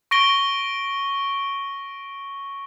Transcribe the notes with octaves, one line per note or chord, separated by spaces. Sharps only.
C#6 A#6 D7 G7